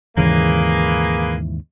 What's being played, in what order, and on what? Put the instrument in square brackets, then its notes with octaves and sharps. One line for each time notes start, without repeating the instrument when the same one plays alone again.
[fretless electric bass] D#2 G#2 C#3 [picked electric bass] E3 [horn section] A#3 G#4 B4